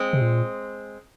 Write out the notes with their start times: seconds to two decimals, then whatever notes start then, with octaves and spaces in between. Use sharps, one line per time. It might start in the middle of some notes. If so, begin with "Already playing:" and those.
Already playing: G#3 C4
0.13 C3
0.22 A#2